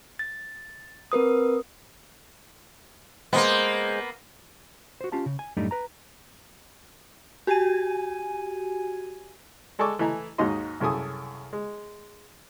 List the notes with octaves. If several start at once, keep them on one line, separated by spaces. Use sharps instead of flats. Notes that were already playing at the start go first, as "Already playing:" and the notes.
A6
C4 A#4 B4 D#6
G#3 A#3 B3 C5
F#4 C5
C#4 F4 G4 A5
C#3
G#5
F#2 A2 G3 A3 D4 D#4
B4 A#5
F#4 G4 G#5 G#6 D#7
G#3 A4 D5 G#5 C#6 D6
E3 A3 D#5 G#5 A#5
D#2 G#2 D#4 F#4 D#5 C6
C2 F#2 C#3 A4 G#5 D#6
G#3